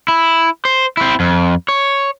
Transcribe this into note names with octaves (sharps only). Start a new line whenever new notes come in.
E4
C5
C4 E4
F2
C#5